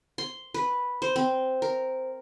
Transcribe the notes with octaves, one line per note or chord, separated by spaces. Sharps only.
C6
B4
C5
C4
A#4